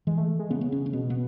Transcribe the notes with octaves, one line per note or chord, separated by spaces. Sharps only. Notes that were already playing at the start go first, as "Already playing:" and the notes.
E3 G#3
A3
G#3
C#3 B3
B3
C#4
C#4
B2 B3
B3